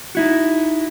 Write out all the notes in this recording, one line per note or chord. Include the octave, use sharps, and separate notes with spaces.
D#4 E4 F#4